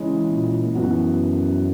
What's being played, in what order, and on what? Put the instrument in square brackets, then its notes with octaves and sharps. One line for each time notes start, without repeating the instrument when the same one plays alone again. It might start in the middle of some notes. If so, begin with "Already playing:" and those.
Already playing: [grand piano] C#3 E3 G#3
[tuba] A#2
[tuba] F#2 [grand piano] E3 B3 F#4